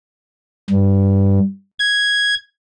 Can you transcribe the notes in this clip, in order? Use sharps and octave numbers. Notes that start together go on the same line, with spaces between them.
G2
G#6